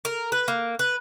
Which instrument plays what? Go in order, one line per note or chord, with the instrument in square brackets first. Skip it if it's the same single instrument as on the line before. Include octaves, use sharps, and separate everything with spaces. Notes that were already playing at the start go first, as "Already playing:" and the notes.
[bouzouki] A#4
B4
A#3
B4